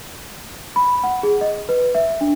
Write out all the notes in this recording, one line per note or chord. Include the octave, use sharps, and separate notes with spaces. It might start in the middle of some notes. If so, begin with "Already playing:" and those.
B5
F#5
G#4
D#5
B4
E5
D4